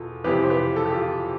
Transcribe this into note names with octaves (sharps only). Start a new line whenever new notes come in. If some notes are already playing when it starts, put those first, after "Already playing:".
Already playing: E2 B2 F4 A4
F2 C3 E3 G4 B4
C5
G4 B4
A4
G4
F4 A4